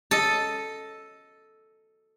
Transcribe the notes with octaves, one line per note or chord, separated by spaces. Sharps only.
A4 D#5